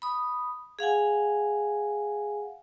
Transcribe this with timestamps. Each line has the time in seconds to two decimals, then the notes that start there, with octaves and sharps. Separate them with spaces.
0.02 B5 D#6
0.79 G#4 F5 F#5 G#5